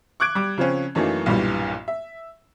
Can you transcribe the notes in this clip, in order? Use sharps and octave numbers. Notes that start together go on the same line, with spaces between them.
C#6 D6 F#6 G#6 D7
G3 D6
C#3 F3 C4 C#4
F#2 E3 F#3 A3 A#3 D#4
B1 G2 A#2 E3 G3
E5